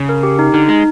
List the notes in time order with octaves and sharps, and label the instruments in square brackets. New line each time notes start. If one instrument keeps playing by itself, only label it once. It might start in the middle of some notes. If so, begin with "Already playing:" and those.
Already playing: [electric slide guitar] C#3
[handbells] A#4
G4
D#4
[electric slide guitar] D3 [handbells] D#4
[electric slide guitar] G#3 [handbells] D#4